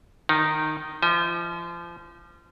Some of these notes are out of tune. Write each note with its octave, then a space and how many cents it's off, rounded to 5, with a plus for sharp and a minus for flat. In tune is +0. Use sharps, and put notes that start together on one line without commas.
D#3 -15 D#4 +0
F3 -30 D#5 +45